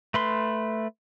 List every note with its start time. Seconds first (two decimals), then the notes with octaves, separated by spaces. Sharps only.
0.14 A3 B4 C6